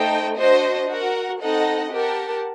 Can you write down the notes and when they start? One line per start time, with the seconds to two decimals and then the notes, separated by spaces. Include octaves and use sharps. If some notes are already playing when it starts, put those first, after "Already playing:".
Already playing: A3 D#4 A4 C5 G5
0.37 D4 F#4 C5 D#5
0.89 F#4 A#4 F#5
1.40 C4 D#4 A4 D#5 F#5
1.91 G4 A#4 F#5 A5